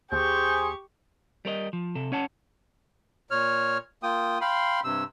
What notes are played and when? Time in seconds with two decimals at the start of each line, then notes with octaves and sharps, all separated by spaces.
0.12 D#2 G4 G#4 C5 C#6 G6
1.45 G3 A#4 B4 D#5
1.73 F3
1.95 C3 A4
2.12 C#4 C#5 F#5 A5
3.31 A#2 C#5 F6
4.03 A#3 F4 G5 D#6
4.41 F5 G5 B5 C6
4.84 G2 C3 E6